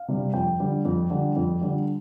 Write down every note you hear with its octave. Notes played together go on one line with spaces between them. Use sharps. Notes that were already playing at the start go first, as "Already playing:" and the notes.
Already playing: F5
C3 G3
F2 G5
D3 G3
F2
D3 G3
F2
D3 G3